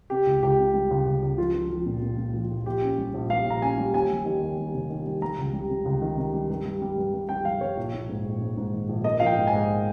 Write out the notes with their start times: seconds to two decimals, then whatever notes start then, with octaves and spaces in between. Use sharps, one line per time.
0.10 C3 G4
0.27 C#2
0.43 C#2 G4
0.59 C3
0.74 G3
0.91 C#2
1.06 C#2
1.22 C#2
1.38 F3 F4
1.54 F3
1.70 F3
1.86 A#2
2.02 A#2
2.18 A#2
2.34 F3
2.50 A#1
2.66 A#1 G4
2.83 C#4
2.98 G3
3.14 A#1
3.30 G3 F5
3.46 A#1 A#5
3.62 C#4 G#5
3.78 G3
3.93 D#2 G#5
4.10 G3
4.25 D#3
4.42 D#2
4.58 G3
4.74 F1
4.90 D#3
5.06 G3
5.22 G3 A#5
5.38 C#2
5.53 G3
5.70 C3
5.85 C#2
6.02 D#3
6.18 C3
6.34 G3
6.50 G2
6.65 G3
6.82 G3
6.98 G2
7.14 G2
7.29 G3 G5
7.45 G2 F5
7.61 G2 C#5
7.77 A#1
7.94 A#1
8.09 G#2
8.26 A#1
8.41 G#2
8.57 G#2
8.73 D#3
8.89 A#1
9.04 A#3 D#5
9.20 F3 F5
9.26 G5
9.37 G#2
9.47 G#5
9.53 G#2